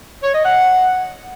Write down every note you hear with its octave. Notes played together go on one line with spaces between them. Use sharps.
C#5
D#5
F#5